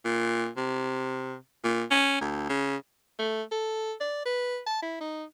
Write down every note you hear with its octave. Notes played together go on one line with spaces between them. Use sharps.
A#2
C3
A#2
C#4
D2
C#3
A3
A4
D5
B4
A5
E4
D#4